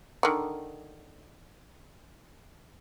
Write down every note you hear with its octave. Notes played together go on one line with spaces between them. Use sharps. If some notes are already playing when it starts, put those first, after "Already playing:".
D3 D#3